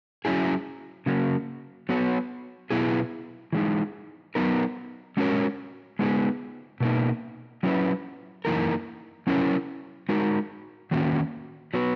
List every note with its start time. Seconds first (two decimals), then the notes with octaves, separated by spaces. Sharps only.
0.25 F#3 C#4 E4 G#4
1.06 C#3 F#3 A#3
1.89 F#3 B3 F#4 C#5
2.70 B2 F#3 B3 E4 G#4
3.53 E3 G#3 D#4
4.35 F#3 B3 D#4 A#4
5.17 G#3 C#4 F#4 A#4 C#5
5.99 G#3 B3 D#4 G#4
6.81 B2 A#3 D#4
7.63 F#3 C#4 E4 B4
8.45 F#2 E3 A#3 D#4 A#4
9.27 F#3 C#4 E4 A#4 C#5
10.09 G#3 D#4 F#4 A#4
10.91 E2 D#3 A#3 C#4 F#4
11.74 F#3 B3 F#4 B4